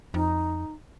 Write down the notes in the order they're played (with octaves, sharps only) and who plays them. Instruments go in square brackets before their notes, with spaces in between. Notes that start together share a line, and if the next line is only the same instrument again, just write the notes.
[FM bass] F2 [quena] D#4